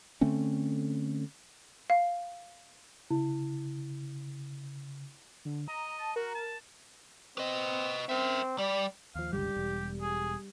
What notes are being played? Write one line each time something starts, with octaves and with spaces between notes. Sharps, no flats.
D3 A3 C4 C#4
F5
C#3 E4
D3
D#5 A#5
A5
F#4 A#4
A5
C4 B4 D#5
C4 A#4 E5
G3 D5
D#2 F3 F5
G1 C#2 G3 G4
E1
G#4